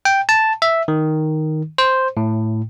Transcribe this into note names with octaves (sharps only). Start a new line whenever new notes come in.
G5
A5
E5
D#3
C5
A2